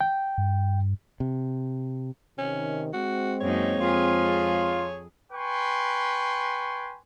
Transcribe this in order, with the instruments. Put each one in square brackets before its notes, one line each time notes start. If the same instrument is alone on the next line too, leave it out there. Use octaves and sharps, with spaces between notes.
[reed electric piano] G5
[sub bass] G2
[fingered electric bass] C3
[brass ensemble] C3 D#3 [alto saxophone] C#4
[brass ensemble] G#3 C4 [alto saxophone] F#4
[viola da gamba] F#2 A#3 D#4 [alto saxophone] C#5
[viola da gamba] F2 G#4 [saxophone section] F4
[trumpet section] B4 G5 G#5 C6 C#6